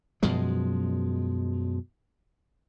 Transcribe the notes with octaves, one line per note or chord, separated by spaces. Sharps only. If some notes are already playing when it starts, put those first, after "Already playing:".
F#2 B2 F3 G#3